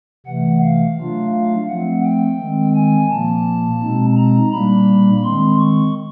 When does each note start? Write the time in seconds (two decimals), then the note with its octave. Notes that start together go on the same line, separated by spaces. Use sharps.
0.27 C3 E3 A3 F#5
0.62 F5
0.97 F#3 A3 D4 F4
1.33 F5
1.69 F3 A3 C4 F#5
2.04 G5
2.40 D#3 G#3 C4
2.75 G#5
3.10 A#2 F3 A#3 A5
3.82 B2 G#3 C4 D#4
4.17 A#5
4.53 A#2 G3 A#3 D4 B5
5.24 D#3 G#3 C4 C6
5.60 C#6